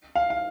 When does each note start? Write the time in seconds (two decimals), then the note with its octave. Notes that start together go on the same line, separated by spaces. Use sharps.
0.15 F5
0.30 F5